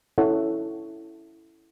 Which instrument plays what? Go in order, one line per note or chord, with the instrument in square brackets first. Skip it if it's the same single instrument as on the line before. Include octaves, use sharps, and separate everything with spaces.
[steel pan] C#4 E4 A4 C#5 F#5